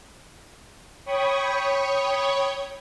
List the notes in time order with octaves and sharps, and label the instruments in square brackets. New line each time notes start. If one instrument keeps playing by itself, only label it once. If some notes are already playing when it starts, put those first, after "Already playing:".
[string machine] C#5 G5 B5 C#6 D#6